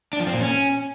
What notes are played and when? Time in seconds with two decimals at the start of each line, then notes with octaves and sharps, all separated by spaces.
0.13 D4
0.20 F3
0.27 C4
0.34 A#2
0.41 C#4